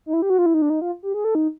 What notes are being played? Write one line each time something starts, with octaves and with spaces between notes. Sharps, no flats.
D#4
E4
G4
F#4
F4
E4
D#4
D4
D#4
F4
G4
G#4
A4
D#4